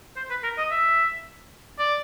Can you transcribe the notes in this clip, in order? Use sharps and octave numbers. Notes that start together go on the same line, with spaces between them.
C5
B4
A#4
D#5
E5
D5